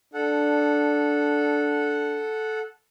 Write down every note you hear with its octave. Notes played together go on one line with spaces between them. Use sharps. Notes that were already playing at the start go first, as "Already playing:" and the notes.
D4 A4 F#5